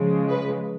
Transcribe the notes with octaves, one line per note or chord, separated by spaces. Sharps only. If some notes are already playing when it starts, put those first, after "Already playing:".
Already playing: C#3 F3 G#3
B4